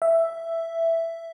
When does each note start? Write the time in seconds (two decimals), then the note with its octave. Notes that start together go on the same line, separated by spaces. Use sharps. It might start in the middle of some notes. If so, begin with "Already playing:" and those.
0.02 E5